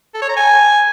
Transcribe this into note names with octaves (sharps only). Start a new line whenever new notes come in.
A4
C#5
A#5
G#5